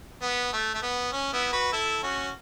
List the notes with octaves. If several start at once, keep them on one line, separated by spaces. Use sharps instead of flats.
B3
A3
A3
B3
C#4
B3 E4
F#4 B4
E4 A4
C#4 F#4